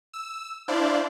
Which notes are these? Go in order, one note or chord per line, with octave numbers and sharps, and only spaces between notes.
E6
D4 E4 C5 D5 F5